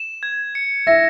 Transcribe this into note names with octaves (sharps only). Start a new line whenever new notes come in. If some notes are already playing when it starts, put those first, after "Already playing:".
Already playing: E7
G#6
C#7
E5 A#6